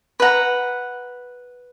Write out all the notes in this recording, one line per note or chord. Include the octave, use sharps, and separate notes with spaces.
B4 F#5 A#5